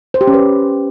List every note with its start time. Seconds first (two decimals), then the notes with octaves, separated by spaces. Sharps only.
0.14 C5
0.21 G4
0.27 C#4
0.34 B4